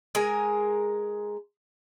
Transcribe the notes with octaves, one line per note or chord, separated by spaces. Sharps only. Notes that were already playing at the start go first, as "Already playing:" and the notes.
G#3 A#4 G#5